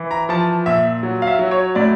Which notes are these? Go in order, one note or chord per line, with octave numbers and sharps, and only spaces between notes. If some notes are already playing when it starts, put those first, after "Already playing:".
Already playing: E3
A#5
F3 A5
A#2 E5
F#3
F5
E5
F#3
C#5
A2 D5